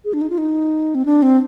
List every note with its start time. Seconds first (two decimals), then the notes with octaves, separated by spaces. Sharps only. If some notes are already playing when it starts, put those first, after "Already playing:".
0.05 G#4
0.13 D4
0.21 D#4
0.30 F4
0.38 D#4
0.95 C4
1.06 D4
1.22 C4